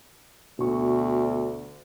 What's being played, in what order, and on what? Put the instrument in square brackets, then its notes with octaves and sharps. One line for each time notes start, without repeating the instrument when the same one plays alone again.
[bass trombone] D2 [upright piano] B2 C#6